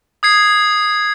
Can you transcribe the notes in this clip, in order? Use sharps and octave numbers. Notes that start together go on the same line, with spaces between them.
D#6 G#6 C7